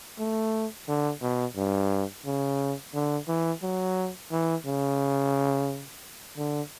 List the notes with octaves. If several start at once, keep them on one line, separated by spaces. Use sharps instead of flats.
A3
D3
B2
G2
C#3
D3
E3
F#3
E3
C#3
D3